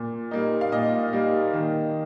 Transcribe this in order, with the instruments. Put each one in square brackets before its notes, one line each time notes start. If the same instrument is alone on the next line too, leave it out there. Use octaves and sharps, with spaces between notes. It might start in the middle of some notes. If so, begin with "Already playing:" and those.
Already playing: [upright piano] A#2
G3 A#3 D#4
F5
A#2 D#5
G3 A#3 D#4
D#3